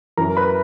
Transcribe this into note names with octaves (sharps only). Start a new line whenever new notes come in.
F#2 E3 A#4 A#5
B4 B5